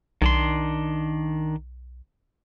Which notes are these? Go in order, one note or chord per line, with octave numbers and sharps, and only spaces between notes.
B1 D#3 D4 C6